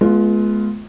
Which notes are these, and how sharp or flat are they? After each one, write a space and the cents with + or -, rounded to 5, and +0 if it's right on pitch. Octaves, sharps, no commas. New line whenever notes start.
G#3 +35 B3 -15 F4 -5